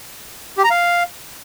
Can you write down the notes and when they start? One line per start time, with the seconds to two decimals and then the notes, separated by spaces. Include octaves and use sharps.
0.58 G4
0.64 A#5
0.71 F5